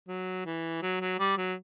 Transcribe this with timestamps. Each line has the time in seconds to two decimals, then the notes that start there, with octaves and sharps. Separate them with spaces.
0.08 F#3
0.46 E3
0.82 F#3
1.01 F#3
1.19 G3
1.37 F#3